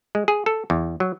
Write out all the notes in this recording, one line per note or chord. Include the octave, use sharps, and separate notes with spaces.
G#3
G#4
A4
E2
F#3